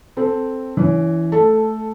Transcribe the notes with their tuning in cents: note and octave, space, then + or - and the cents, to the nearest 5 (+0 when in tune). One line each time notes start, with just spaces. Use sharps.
C4 +0 A4 +0
E3 +0 C#4 +25
A3 -5 A4 +0